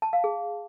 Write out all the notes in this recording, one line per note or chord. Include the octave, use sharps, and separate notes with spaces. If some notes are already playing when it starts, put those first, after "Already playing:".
A5
F5
G#4